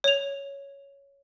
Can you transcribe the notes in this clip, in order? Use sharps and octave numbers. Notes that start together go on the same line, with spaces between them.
C#5 F7